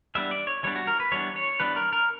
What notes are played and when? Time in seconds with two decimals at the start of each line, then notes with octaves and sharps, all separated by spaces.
0.15 E3 G3 B3 D4 E5
0.31 D5
0.47 C#5
0.63 E3 G3 B3 D4 C#5
0.76 F#4
0.87 A#4
1.00 B4
1.12 E3 G3 B3 D4 C#5
1.36 C#5
1.60 E3 G3 B3 D4 B4
1.76 A#4
1.93 A#4